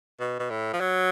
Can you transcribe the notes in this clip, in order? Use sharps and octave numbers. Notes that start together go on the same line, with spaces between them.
B2
B2
A2
F3
F#3